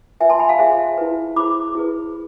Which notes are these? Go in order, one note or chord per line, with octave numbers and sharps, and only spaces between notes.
F4 B4 E5 G#5
A5 C6
G#5 B5
F5 A5
F4 G#4 C5 E5 G#5
E4 B4
E4 G#4 C5 B5 D6
E4 G#4 B4